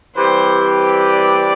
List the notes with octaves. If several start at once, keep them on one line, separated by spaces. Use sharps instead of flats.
E3 G3 C4 G4 C5
D5